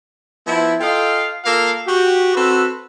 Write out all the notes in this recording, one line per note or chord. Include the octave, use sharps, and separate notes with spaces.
F3 B3 E4
F4 A4 D#5 F5 G5
A#3 F4 A4 A#4 F5
F#4 G4
C4 F#4 A4 B4